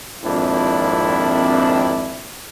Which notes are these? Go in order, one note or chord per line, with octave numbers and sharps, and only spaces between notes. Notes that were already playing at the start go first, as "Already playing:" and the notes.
G#1 F2 A#2 C4 D4 E4